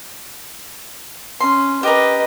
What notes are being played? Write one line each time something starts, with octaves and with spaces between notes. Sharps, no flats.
C#4 C6
G4 A#4 B4 D#5